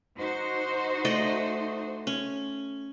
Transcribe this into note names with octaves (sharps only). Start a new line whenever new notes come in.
D#4 F#4 C5
A3 D5 D#5
C#4